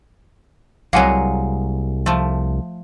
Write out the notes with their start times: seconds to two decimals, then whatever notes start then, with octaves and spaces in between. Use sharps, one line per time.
0.93 C2 F#3 G#3 A#3 F5 F#5 G#5
2.06 F3 A3